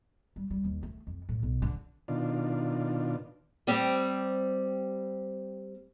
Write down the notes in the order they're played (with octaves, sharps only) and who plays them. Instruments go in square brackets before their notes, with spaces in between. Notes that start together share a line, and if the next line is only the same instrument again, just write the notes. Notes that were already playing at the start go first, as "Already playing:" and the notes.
[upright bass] G3
G3
D#2
A3
F2
A2
B1
D3
[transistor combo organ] B2 D#3 D4 F4
[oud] G3 C4 G4